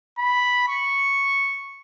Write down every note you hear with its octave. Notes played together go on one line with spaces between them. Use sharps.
B5
C#6